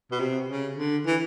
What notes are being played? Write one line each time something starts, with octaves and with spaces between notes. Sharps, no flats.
B2
C3
C#3
D3
E3